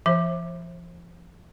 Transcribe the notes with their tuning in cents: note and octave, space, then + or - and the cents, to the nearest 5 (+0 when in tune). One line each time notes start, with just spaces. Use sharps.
F3 -35 C5 +30 E5 +0